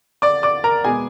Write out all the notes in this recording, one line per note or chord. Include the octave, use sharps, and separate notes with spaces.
D5 D6
D5 D6
A#4 A#5
B2 G#3 B3 G#4 G#5